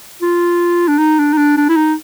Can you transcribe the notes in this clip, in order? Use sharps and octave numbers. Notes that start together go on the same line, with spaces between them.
F4
D4
D#4
D4
D#4
D4
D4
E4
D#4